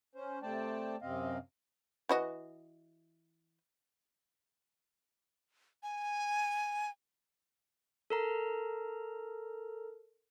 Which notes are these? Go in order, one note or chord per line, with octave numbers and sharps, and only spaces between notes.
C#4 C5
C3 A3 C5 D5 G5 A5
F#2 C3 C4 D#5 F5
E3 F#4 D#5
G#5
A4 A#4 A#5